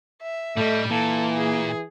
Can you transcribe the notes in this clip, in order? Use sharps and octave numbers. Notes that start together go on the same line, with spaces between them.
E5
A2 G3 A3 D#5
A#2 E3 A#3 A4
G#4